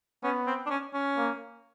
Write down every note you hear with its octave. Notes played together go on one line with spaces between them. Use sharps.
B3 C#4
C4
D4
C#4
C#4
A#3